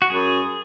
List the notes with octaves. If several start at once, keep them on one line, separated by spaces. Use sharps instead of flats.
F#4
F#2 G#4